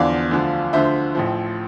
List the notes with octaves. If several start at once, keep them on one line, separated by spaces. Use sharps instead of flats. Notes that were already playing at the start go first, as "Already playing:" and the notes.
Already playing: E2 D3 F3 D5 F5
D2 D3 F3
D2 D3 F3 C5 E5
A1 A2 F3